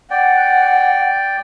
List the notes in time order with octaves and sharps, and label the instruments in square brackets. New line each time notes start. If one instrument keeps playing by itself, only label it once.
[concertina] D5 G5 [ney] F#5